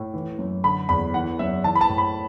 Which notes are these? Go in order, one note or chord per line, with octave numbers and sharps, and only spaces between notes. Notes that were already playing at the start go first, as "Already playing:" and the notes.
Already playing: A2
E3
F#2
D3 B5
E2 B5
E3 F#5
F#2 E5
E3 A5
B5
A5
A2
B5